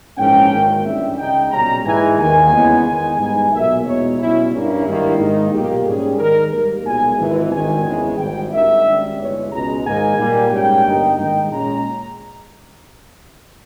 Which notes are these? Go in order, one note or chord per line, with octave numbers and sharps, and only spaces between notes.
A#1 G#2 E3 A#3 C#4 G5
G#1 G#2 D#3 A#3
G2 E3 G3 C#4 E5
C#2 C#3 G#3 D#4 G5
B1 A#2 G3 C#4 A#5
G#2 E3 G#3 G#5
D#2 D#3 A#3 G#5
E2 C#3 G#3 B3 D#4
E2 D#3 G#3 D#4 G#5
G#2 G3 B3 D#4 G#5
B1 A#2 A#3 E5
E2 B2 G#3 D#4 C#5
B1 B2 G3 C#4 E4
G2 G3 A#3 C#4 E4
G#1 G2 D#3 G3 A#3
G#2 D#3 A#3 D#4
B1 A#2 A#3 G4
G#2 G3 C#4 G#4
G#2 D#3 G#3 D#4 A#4
G#2 G3 A#3 A#4
B1 A#2 G#3 G#5
G#1 G#2 E3
G#1 G2 D#3 G#5
E2 C#3 E3 G#3
G#1 G#2 G3 G5
G#1 G2 D#3 A#3 D#4 E5
G#1 G#2 G3 C#4
G1 G2 E3 G#3 C#5
C#2 B2 G#3 C#4 A#5
G#2 D#3 A#3 D#4 G#5
A#2 G3 A#3
G#2 G3 A#3 C#4 G5
G1 G2 G3 A#3 D#4
G#2 D#3 A#3 D#4 G5
A#2 G#3 C#4 A#5